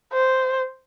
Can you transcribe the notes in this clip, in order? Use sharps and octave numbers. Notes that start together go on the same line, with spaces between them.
C5